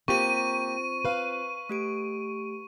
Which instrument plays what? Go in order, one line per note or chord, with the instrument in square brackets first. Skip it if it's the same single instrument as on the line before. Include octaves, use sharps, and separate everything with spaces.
[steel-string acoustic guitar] A#3 G4 [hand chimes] C4 F4 C5 [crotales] C#6 D#7
[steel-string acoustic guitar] B4 F5
[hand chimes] A3 G4 D7